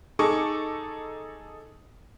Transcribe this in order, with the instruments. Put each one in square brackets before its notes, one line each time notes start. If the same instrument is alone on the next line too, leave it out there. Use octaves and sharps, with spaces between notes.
[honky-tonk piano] D#4 G#4 A4 C#6 D6